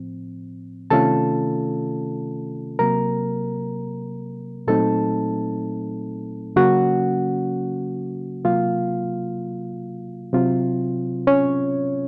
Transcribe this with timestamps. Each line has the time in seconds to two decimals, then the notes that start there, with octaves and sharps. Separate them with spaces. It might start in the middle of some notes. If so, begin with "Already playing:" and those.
Already playing: A2 F3 C4
0.90 C3 D#3 A3 C#4 F4 A4 A5
2.79 C3 F#3 A#3 A#4 A#5
4.67 A#2 F#3 A3 C4 D#4 A4 A5
6.56 C#3 F#3 A#3 C#4 F#4 F#5
8.44 C3 F#3 A#3 F4 F5
10.33 C3 F#3 C4 F4
11.27 C#4 C#5